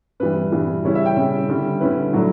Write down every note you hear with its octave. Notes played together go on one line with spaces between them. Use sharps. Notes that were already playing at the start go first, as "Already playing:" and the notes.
G2 E3 G3 B4
G2 E3 G3
C#3 G3 C#4 E4 C#5
E5
G5
C#3 G3 C#4 E4
D3 G3 C#4 E4
D3 G3 C#4 E4 B4
A2 F#3 A3 D4